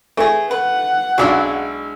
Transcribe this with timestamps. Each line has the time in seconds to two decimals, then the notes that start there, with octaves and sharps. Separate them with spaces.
0.17 E3 A3 G#4
0.51 B4 F#5
1.18 B1 C#3 F#3 G#3 D4 E4